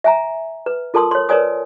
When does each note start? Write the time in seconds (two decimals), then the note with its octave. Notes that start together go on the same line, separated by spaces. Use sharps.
0.04 E5 G#5 A#5
0.66 B4
0.94 F4 A4 A#4 A5 C6 D#6
1.11 C#5 C6
1.29 A#4 B4 C#5 D5 G#5 D#6